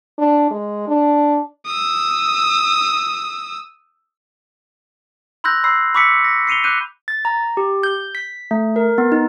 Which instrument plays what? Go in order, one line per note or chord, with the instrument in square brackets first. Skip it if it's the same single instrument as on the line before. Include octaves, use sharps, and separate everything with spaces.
[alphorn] D4
G#3
D4
[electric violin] D#6 E6
[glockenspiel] B5 C6 E6 F#6 G6 A#6
B5 C6 E6 C7
B5 C#6 D6 E6 B6 C#7
A#6
C7 C#7 D#7 F7 G7
D6 F#6 G6 D#7
[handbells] A6
A#5
G4
G6
B6
A3
A#4
B3
D#4